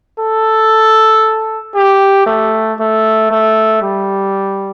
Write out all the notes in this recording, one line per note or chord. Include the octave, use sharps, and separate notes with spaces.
A4
G4
A3
A3
A3
G3